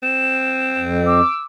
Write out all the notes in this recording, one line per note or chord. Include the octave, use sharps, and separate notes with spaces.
C4 E7
F2
D6 E6